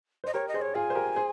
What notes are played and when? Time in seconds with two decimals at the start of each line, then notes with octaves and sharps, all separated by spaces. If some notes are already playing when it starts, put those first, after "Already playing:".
0.24 C5 D#5
0.34 G4 A#4 C#5
0.48 D#5
0.54 G#4 C5
0.62 C#5
0.75 F4 G#4 G#5
0.90 C5
0.95 G4 A#4
1.16 G#4 C5